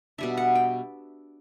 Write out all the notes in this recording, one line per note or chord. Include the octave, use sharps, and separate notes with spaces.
B2 G3 D4 E5
F#5
G5